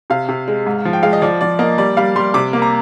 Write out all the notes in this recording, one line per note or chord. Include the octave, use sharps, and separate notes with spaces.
C3 F5
C3
G#3
G#2
F3
G5
G#3 F5
D#5
F3 D5
F3 D5
A#3 D#5
G3 D5
G3 F5
G3 C6
C3 D6
A#3
A#5